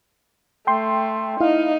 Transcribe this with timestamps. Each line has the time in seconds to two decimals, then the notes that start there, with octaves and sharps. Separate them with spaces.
0.67 A3 G5 C6
1.40 D#4 E4 F5